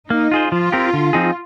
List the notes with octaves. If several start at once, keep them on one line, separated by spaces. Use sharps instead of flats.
A#3 D#4
F4 G#4 C5
F3 F4
C4 G4 A#4
D3
F3 C4 D#4 G#4